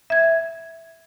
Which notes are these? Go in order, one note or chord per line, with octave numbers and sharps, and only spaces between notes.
E5 G#6